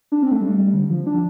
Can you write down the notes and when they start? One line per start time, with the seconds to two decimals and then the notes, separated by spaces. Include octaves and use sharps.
0.12 D4
0.23 C4
0.32 A3
0.41 G3
0.58 G3
0.73 D3
0.90 F3
1.07 D4